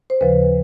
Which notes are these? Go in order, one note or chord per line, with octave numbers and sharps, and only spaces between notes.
C5
D#2 C#3 F3 B4